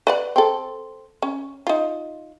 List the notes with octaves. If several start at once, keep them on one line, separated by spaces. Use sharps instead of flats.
B4 D5 F#5
C4 A4
C#4
D#4 F4